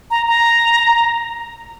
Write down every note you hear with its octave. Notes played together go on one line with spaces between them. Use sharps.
A#5
A#5